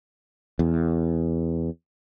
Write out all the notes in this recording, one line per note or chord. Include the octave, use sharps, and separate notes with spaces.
E2